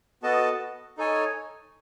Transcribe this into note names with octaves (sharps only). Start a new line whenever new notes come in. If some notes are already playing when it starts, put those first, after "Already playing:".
B3 F#4 A4 D#5 A5
D#4 A4 C#5 G#5